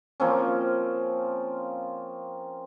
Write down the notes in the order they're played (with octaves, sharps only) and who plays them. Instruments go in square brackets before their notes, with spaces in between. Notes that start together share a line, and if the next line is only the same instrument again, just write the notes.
[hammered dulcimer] F3 A#3 C4 C#4